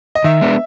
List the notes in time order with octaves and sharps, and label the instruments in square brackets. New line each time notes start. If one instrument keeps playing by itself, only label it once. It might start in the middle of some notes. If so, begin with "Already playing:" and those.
[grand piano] D#5
[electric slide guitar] D#3 [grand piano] E5
[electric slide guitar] G#3 B3 D4